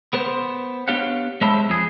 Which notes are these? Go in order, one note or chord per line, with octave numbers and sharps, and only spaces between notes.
B3 A#4 C5
B3 D4 G4 C#5 F5 F#5
G#3 C5 C#5 E5 A5 B5
F2 G#4